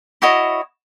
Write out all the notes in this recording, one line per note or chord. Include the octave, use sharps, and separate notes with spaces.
E4 F#4 C#5 D#5